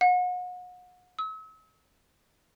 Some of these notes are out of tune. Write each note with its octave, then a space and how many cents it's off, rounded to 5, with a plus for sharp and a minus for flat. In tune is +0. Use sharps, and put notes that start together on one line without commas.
F#5 -40
E6 -40